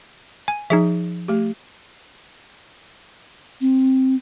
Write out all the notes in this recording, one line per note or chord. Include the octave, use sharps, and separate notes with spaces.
G#5
F3 D#4 G#4 E5
A3 G4
C4